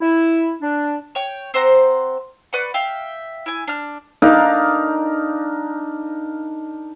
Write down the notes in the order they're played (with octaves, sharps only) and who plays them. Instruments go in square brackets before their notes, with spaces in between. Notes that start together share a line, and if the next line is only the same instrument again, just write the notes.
[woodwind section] E4
D4
[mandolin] C#5 G5
C4 C5 F#5 A#5
B4 D5 F#5 C#6
E5 F5 G5
E4 G#5
D4 F6
[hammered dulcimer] D4 D#4 A#4 F5